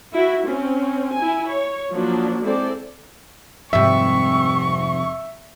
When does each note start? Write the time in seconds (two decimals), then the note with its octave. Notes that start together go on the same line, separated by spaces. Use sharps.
0.15 E4 F#4
0.48 C4 C#4
1.17 E4 G#5
1.50 C#5
1.93 F3 F#3 A#3 D4
2.44 G#3 C4 E4 A4 C5 D5
3.73 F2 G#2 C3 G3 E5 C#6